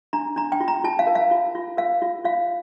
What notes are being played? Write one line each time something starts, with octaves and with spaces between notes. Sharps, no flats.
D4 A#5
D4 A#5
G5
F4
A#5
F4 A5
F5
A#4
F5
F4
F4
A#4 F5
F4
F4 F5